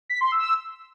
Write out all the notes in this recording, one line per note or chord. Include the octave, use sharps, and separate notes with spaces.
B6
C6
E6